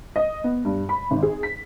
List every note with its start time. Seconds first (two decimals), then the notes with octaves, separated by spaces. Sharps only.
0.16 D#5
0.44 B3
0.65 G2
0.89 B5
1.11 G#1
1.23 G#4
1.43 B6